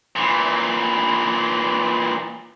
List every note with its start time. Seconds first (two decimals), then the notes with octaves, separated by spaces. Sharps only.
0.16 A#2 E3